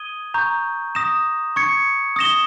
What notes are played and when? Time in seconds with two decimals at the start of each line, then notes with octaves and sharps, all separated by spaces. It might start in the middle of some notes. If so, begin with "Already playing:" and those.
Already playing: D#6 G#6 D#7 G7
0.34 A#5 C#6 G6
0.95 D#6 A#6 E7
1.56 C#6 G#6 C#7
2.16 D#6 A#6 E7 G7